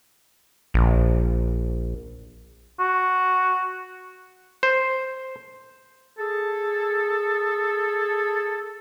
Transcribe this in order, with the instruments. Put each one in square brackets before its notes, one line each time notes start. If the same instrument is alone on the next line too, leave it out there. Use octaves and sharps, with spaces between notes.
[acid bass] A#1
[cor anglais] F#4
[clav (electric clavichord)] C5
[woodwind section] G#4 A4